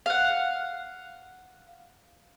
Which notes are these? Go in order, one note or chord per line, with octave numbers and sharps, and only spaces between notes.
F5 F#5